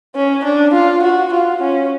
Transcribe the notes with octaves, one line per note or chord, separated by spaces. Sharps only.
C#4
D4
F4
F#4
F4
C#4